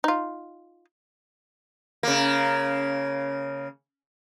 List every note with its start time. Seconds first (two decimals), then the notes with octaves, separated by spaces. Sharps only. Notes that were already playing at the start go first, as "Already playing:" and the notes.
0.04 D#4 F4
2.03 C#3 A#3